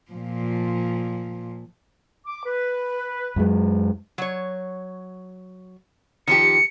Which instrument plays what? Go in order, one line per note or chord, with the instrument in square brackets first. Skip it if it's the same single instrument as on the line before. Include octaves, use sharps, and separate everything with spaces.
[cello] A#2 F3
[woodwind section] D6
B4
[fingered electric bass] F#2 F#3 G#3
[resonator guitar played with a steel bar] F#3 C#5
[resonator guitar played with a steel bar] D#3 F3 G4 [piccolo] C#7